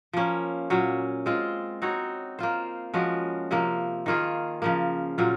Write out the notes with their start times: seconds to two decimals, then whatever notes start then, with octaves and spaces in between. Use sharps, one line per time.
0.13 F3 A#3 C#4
0.70 A#2 F#3 C#4
1.26 G#3 C4 F4
1.82 C4 D#4 F#4 C#5
2.39 A#3 F4 C5
2.94 F3 G#3 C#4 F#4
3.51 C3 F3 A#3
4.06 D#3 A#3 F4 G#4
4.62 C#3 F3 A#3
5.18 A#2 F#3 C#4 F4